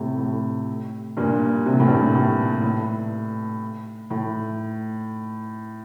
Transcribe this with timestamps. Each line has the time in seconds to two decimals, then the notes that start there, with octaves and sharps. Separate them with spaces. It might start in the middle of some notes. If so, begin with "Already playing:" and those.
Already playing: A2 C3
0.19 A2
1.17 G2 A#2
1.66 C3
1.74 A#2
1.80 A2
1.86 G2 A#2
2.15 A2
2.63 A2
4.10 A2